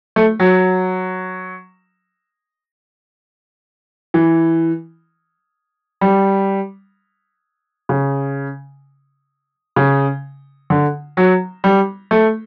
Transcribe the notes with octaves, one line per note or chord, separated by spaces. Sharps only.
A3
F#3
E3
G3
C#3
C#3
D3
F#3
G3
A3